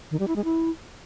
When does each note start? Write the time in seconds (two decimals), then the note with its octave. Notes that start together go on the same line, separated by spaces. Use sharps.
0.11 D#3
0.19 G3
0.28 E4
0.36 G#3
0.44 E4